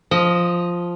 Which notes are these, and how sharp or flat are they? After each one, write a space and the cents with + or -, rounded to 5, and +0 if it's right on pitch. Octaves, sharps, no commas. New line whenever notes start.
F3 +0 D#5 +0